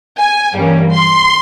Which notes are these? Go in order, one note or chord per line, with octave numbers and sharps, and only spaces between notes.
G#5
G2 E3 G3 A#3 C#4
C6